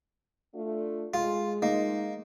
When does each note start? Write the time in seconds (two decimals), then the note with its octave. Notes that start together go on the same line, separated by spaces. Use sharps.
0.54 A3 D4 F4
1.14 G#3 F4
1.62 A#3 D#4